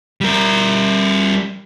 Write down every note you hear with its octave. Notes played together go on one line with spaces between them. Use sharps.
G3 A#4